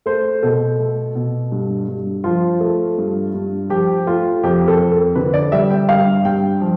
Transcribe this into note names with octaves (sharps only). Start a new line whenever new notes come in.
A3 C5
B2 A4
A3
B2
G2
G2
F3 F4
A3
G2
G2
F3 G4
A3 F4
F2 G4
A4
F2
A4
D3 B4
D5
G3 E5
G5
G2 F5
G2 G5
F3